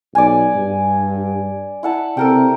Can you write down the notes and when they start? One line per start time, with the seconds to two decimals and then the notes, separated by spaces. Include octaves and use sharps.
0.15 B1 D5 G#5
0.55 G2
1.83 E4 F#5 A5
2.17 C3 A4 A#4 G5